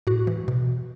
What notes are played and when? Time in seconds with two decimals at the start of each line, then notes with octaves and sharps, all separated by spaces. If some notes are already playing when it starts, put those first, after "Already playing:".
0.07 A2 F#4
0.27 E3
0.48 B2